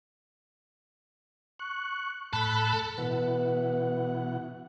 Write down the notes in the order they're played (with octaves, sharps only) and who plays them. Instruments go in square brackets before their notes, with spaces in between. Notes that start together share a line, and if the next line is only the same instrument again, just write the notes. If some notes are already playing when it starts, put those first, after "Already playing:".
[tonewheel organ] C#6 F#6
[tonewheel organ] A2 B5 F#6 [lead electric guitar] A4
[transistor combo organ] B2 E3 F#5 [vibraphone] B4